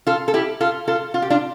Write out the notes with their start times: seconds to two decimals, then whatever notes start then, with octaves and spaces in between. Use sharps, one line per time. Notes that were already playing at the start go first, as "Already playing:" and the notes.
0.07 F4 A4
0.28 A4
0.34 E4 G4
0.61 F4 A4
0.87 F4 A4
1.14 F4
1.22 G4
1.30 D4 F4